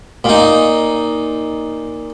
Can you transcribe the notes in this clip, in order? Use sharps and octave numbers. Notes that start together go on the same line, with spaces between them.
A#2 D#4